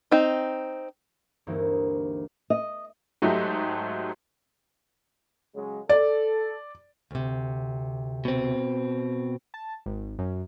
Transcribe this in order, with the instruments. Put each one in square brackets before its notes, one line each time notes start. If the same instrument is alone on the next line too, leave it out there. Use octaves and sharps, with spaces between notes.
[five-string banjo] C4 D#4
[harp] D2 G2 E3 A#3 C4 D#4
[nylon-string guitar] D#5
[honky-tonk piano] G#2 F#3 A3 D#4 G4
[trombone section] C#3 F#3 G#3
[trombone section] A4 [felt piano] D5
[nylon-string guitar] D2 C3
[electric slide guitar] B2 C4
[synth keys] A5
G#1
F#2